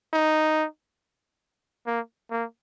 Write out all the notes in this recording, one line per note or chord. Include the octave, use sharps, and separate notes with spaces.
D#4
A#3
A#3